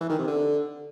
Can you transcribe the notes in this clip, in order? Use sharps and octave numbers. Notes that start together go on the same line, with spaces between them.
E3
D#3
C3
D3